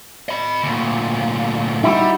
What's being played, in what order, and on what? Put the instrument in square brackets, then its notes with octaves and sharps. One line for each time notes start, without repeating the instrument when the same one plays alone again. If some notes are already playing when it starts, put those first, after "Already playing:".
[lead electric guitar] D#5 B5
D2 A#2
[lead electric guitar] G3 [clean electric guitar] D#4 E4 F#4